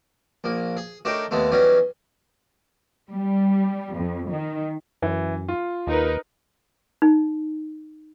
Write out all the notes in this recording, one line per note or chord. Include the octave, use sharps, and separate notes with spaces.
A#1 A#3
G#4
A3 D4 D#4 A#4 C#5 G5
D#2 G#3 A3 B3
E3 F#3 G3 B3 C#4 D#4
G3
F2
D#3
F#2 E3
F4
D#2 D#4 A#4 B4
D#4